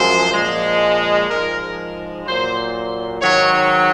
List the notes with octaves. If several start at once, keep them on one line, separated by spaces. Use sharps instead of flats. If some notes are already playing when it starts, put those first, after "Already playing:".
Already playing: F#2 F3 G#3 C5
A#2 F3 G#3
G#2 F3 G#3 A#4
A#2 F#3 C5
G#2 D#3 F#3 C#5